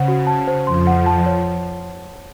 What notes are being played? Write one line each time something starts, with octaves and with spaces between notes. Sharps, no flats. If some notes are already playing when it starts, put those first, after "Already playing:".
Already playing: C#3 C5 F#5
F#4
A5
C5
F2 F3 C6
F#5
A5
C#5